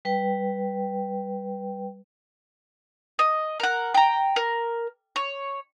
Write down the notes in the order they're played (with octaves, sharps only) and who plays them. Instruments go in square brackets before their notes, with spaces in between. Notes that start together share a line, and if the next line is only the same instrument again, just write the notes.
[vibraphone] G3 B4 G5
[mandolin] D#5
A#4 F#5
G5 A#5
A#4
C#5